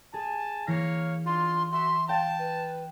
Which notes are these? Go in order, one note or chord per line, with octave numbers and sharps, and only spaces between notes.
G#4 G#5 A5
E3 A#3 C#5 F5 A#6
D4 F4 C6
F#4 E5 C6
F5 G5 A5
B4